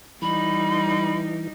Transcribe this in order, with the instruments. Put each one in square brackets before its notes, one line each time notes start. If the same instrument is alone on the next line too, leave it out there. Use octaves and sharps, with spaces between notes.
[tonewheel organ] E3 [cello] G3 D#4 [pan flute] B5